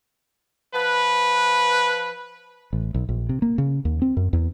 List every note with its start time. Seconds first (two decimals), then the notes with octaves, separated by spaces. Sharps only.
0.74 F3 B4
2.73 A1
2.95 B1
3.09 A#1
3.29 C3
3.42 A#3
3.58 C#3
3.85 D#2
4.02 C4
4.17 F#2
4.33 E2